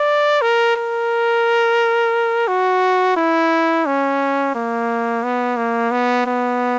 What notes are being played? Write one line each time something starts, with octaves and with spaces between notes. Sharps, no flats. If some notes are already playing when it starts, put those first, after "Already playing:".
Already playing: D5
A#4
A#4
F#4
E4
C#4
A#3
B3
A#3
B3
B3